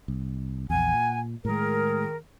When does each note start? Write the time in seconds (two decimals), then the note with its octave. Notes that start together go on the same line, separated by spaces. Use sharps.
0.08 C2
0.70 A#1 E2 F#5 G#5
0.94 A#2
1.45 A2 D#3 G#3 G#4 A#4